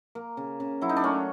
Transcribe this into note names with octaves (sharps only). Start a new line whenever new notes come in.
A#3
C#3
C#3
F#3 E4
D#4
D4
A3 C#4